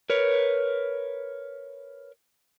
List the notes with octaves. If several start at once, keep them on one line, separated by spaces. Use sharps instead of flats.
A#4 B4 C#5